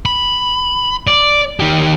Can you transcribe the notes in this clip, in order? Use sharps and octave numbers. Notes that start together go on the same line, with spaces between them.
B5
D5
D#3 G4